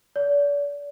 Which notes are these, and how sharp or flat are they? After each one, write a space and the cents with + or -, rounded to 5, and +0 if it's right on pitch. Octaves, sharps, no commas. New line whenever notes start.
D5 -40